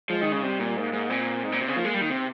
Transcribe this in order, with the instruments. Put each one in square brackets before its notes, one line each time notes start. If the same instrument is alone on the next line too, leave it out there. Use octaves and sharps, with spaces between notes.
[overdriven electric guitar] F3 [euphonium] G#3
[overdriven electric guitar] D#3
C#3
[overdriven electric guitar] C3 [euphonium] G3
[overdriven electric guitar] A#2
[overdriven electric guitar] G#2 [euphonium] A#3
[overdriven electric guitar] G#2
[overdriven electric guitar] A#2 [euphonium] C4
[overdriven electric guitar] G#2
A#2
C3
C#3
[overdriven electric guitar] F3 [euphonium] A#3
[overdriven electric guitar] G#3
G3
D#3
C3